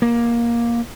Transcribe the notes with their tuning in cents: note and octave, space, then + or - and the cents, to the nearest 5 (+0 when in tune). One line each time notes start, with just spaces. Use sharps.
A#3 +15